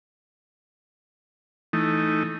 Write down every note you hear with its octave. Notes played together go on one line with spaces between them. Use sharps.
E3 A3 D#4